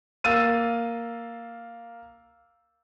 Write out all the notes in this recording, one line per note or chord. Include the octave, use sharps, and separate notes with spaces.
A#3 F5 E6 A6 D#7